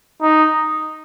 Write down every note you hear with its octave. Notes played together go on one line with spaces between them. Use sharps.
D#4